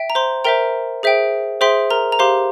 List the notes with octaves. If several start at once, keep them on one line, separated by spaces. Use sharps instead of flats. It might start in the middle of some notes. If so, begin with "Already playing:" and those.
Already playing: E5 G5
A#5
C5 C6
A#4 C5 E5 G5 A#5
G#4 C5 E5 G5
G#4 C5 E5 G5 C6
A#4 A#5
A#5
G4 C5 F5 C6